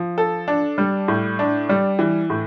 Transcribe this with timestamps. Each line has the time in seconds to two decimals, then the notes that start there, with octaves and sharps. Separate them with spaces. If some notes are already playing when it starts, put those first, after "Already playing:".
Already playing: F3
0.18 A4
0.48 D4
0.78 G3
1.08 A2
1.39 D4
1.69 G3
1.99 E3
2.30 A2